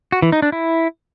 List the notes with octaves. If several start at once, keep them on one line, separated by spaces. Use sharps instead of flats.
F#4
E3
D#4
D4
E4